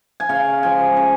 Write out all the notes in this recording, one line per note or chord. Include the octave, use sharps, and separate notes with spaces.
G#5
C#3 F5
F3 G#3 G#5
C#3